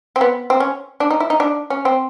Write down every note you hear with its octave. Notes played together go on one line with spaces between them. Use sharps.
C4
B3
C4
C#4
D4
D#4
E4
D#4
D4
C#4
C4